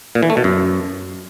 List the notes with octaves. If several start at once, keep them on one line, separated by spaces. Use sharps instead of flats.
A#2
E3
A3
B2
F#2